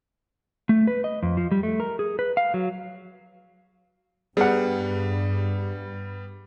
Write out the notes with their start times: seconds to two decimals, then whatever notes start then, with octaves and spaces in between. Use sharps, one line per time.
0.69 A3
0.87 B4
1.04 D#5
1.23 F2
1.37 F3
1.51 G3
1.63 A3
1.80 A#4
1.99 G#4
2.19 B4
2.37 F5
2.54 F#3
4.37 G2 G3 B3 G#4 F#5